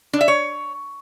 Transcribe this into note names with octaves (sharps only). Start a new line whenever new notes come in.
D4
E5
C#5